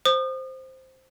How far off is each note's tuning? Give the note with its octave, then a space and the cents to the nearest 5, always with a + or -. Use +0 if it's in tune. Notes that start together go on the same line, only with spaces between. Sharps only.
C5 +0 D#6 -35